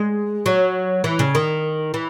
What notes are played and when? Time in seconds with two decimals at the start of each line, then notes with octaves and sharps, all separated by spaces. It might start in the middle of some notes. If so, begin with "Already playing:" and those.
Already playing: G#3
0.46 F#3
1.04 E3
1.19 C#3
1.35 D#3
1.94 E3